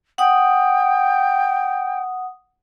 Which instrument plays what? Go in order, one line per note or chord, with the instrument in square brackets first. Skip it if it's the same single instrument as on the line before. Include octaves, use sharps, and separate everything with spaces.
[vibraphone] F#5 D#6 [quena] G5